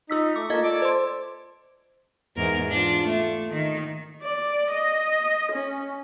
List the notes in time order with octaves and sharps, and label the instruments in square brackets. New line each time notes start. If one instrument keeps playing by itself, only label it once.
[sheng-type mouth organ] D#4 [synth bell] F4 E6 B6
[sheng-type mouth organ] A3 C#6 [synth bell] D6
[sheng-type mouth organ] A#3 A4 [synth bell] F4 D#5 G#6
[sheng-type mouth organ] A4 D5 D6
[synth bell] C5 C6
[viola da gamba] E2 G#2 A#4
D4 F4
A3
D#3
[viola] D5
D#5
C#4